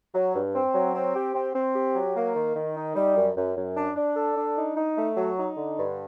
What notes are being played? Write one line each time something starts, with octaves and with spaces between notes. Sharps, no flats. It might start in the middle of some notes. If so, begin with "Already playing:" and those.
F#3
G2
C4
F#3
C4
G4
C4
C4
G4
F#3
A#3
D#3
D#3
D#4
G3
F#2
F#2
F#2
D4
D4
A4
D4
D#4
D#4
A3
F#3
D#4
D3
G2